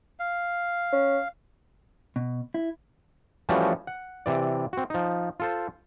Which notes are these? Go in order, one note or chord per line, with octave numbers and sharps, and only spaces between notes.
F5
C#4
B2
E4
E3 F3 G3 A3 C#4 F#4
F#5
C3 E3 D5
C4 F#4
F3 D#4
F4 A4 C5